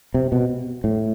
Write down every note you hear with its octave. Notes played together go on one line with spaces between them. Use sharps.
C3
B2
A2